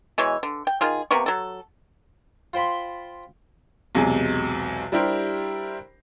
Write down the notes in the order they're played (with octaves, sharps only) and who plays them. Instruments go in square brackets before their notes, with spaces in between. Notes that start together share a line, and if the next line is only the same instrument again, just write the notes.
[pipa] B2 E3 G#3 C#5
D3
G5
D#3 F4 G#4
C3 A#3 B3 C#6
F#3 A4
[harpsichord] F4 C5 G5 B5 C6
[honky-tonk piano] B1 E2 C3 G#3 G#5
G3 D4 E4 G4 A#4 C5